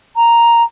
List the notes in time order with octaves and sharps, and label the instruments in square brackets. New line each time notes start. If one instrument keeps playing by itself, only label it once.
[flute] A#5